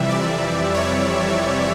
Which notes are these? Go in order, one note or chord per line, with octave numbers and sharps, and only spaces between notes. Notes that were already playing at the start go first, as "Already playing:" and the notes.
Already playing: F2 C3 E3 G3 E5
D5
C#5